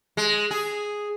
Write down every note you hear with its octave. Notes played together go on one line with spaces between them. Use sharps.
G#3
G#4